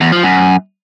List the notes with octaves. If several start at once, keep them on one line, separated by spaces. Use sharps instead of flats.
E2
F3
F#2